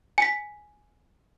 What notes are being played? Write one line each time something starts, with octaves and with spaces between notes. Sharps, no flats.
G#5 B6